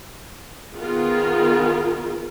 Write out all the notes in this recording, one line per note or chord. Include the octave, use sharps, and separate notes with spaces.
D#3 B3 F4 G#4 A#4